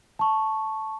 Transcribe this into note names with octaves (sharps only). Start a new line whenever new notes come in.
A5 C#6